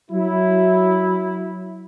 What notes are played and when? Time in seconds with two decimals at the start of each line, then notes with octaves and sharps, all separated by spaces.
0.11 F#3 E4